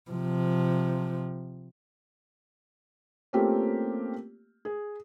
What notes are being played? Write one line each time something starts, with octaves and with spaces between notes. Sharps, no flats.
C3 F3
A3 A#3 C4 C#4 F4 G4
G#4